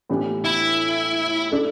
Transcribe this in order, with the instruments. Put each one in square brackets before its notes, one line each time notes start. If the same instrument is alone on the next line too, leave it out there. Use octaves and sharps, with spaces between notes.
[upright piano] A2 E3 B3 D4 G4
[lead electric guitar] E4
[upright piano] A3 D4 A4 D5